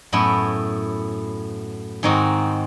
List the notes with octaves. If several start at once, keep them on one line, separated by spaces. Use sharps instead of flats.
F#2 A2 B3 E4
G#2 D#3 C4 D#4 F#4